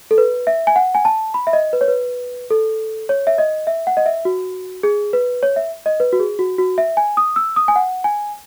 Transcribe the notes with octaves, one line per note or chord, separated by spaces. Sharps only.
A4
B4
E5
G#5
F#5
G#5
A5
B5
E5
D#5
B4
C#5
B4
A4
C#5
E5
D#5
E5
F#5
D#5
E5
F#4
G#4
B4
C#5
E5
D#5
B4
F#4
G#4
F#4
F#4
E5
G#5
D#6
E6
D#6
G#5
F#5
G#5